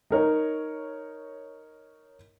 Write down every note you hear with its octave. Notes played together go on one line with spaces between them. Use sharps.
D#4 A#4 C#5